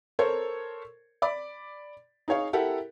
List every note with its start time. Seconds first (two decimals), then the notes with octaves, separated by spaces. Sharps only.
0.19 A4 A#4 C5 C#5
1.22 D5 B5 D6
2.28 D#4 G#4 C#5 F5
2.53 E4 G4 A4 A#4 F#5